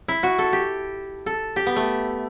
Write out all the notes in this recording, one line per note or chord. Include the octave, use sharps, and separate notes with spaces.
E4
F#4
A4
G4
A4
G4
B3
A3